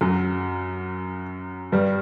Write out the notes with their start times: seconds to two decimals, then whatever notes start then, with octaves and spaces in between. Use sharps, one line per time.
0.01 F#2 F#3
1.72 G2 G3